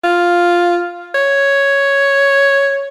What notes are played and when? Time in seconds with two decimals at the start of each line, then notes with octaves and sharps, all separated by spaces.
0.04 F4
1.15 C#5